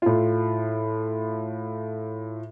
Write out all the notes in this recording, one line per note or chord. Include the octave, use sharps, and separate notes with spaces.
A2 F4